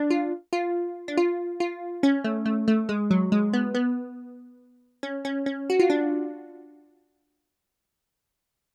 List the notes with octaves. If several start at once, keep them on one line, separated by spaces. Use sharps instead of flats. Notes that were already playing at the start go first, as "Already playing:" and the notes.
Already playing: D4
F4
F4
D4
F4
F4
C#4
A3
A3
A3
G#3
F#3
G#3
B3
B3
C#4
C#4
C#4
F#4
F4
D4